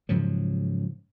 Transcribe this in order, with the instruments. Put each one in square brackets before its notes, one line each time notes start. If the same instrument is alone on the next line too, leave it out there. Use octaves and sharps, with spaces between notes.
[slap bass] G#2 C#3 F3 F#3